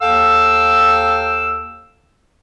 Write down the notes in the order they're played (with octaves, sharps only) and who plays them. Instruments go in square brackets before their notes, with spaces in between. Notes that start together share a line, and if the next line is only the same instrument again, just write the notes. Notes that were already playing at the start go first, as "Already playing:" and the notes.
[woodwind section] D#2 A4 F5 G5 E6